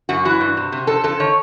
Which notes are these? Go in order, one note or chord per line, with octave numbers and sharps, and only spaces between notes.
F#2 F#4
E3 F#4
G2
C3
C3
F2 A4
F2 A4
D#3 C#5